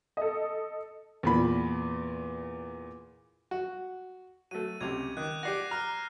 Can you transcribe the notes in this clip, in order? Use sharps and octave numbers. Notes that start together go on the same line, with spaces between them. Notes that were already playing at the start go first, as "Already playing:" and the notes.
A4 D#5
E2 A#2 B5
F#4
F#3 A3 D#7
C#2 C3 G#6 F7
D#3 D6 F#6
G4 D5 F#5 A#6 C7 D#7
A#5 F6 F#6